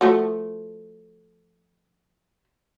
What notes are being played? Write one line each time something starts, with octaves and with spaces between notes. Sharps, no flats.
F3 A3 F#4